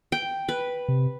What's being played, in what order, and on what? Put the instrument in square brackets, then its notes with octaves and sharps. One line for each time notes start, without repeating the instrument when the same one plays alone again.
[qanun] G5
B4
[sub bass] C3